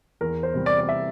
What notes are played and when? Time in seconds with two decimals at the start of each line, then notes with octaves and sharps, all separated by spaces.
0.21 E2 A#4
0.43 C5
0.54 C3 G3
0.66 D5
0.81 D5
0.89 E5